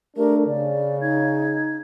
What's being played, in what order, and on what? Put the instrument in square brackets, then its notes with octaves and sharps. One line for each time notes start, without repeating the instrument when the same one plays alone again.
[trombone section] A3 D4 [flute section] G4 A#4
[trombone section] C#3 [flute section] D5
[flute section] D#4 G#6